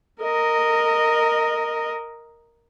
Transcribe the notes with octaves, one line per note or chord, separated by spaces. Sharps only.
A#4 D#5